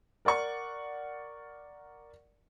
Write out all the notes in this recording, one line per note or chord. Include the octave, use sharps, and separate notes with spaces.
A#4 D5 F#5 C#6